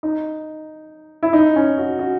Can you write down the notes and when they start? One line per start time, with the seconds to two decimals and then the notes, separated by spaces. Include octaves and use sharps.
0.03 D#4
1.23 E4
1.33 D#4
1.56 C#4
1.78 F#4
1.99 F#4